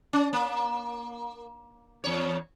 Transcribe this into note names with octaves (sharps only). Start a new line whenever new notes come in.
C#4
A#3
E2 C#5